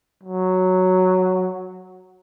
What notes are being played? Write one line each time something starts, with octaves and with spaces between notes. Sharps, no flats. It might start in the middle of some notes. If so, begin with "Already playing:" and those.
F#3